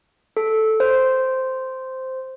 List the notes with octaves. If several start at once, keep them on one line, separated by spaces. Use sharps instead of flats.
A4
C5